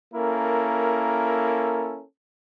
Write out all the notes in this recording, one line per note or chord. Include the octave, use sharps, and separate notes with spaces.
A#3 C#4 E4 A4 A#4